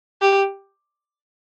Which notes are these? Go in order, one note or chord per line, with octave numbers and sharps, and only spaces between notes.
G4